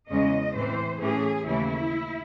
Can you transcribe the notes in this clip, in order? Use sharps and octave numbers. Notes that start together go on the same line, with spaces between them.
E2 C#3 G#3 C#4 D#5
A2 E3 C4 C5
A2 E3 A3 C#4 G#4
D#2 C#3 E3 A3 E4